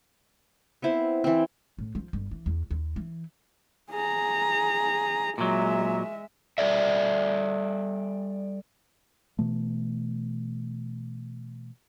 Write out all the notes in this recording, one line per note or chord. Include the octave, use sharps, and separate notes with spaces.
B3 C4 E4 C5
E3 C4
A2
F3
G1
E3
E2
D#2
E3
G#4 A#5
A#2 F#3 G#3 E5
G3 A4 D5 E5
B2 E3 A3